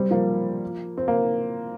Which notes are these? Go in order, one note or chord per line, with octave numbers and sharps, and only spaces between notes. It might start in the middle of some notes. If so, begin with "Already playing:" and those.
Already playing: G3 C4
F3 A#3
C4
A#3